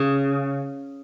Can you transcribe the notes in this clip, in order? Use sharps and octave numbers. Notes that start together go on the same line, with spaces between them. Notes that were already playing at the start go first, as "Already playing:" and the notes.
Already playing: C#3